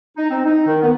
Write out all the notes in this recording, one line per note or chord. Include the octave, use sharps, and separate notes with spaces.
D#4
C4
D#4
D#3
B3